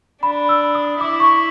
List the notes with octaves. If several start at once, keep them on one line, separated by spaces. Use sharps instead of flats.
D4 B5
E6
D#6
E4 D6
C#6